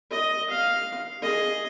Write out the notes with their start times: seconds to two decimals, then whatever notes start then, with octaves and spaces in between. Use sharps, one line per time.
0.10 D#5
0.50 F5
1.22 G#4 D#5